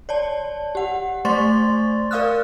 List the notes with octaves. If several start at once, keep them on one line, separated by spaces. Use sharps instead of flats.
C#5 D5 A5
G4 F#5
A3 C5 D5 C6 C#6 A6
A#4 D5 F5 D#6 F6 F#6